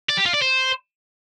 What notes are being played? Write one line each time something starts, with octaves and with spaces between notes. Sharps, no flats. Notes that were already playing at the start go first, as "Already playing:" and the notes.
D5
G4
F4
D5
C5